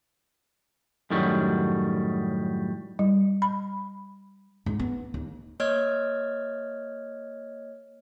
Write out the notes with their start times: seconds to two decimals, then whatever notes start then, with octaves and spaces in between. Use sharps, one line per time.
1.10 F#2 A2 D#3 F#3 G3
2.99 G3
3.42 B5
4.66 G#2
4.79 B3
5.14 D#2
5.60 A#3 C#5 D#5 F6 G#6